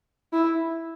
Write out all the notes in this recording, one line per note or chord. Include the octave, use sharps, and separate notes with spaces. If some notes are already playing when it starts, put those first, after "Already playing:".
E4